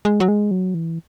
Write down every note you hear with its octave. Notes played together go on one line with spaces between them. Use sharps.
G#3
F#3
G#3
F#3
E3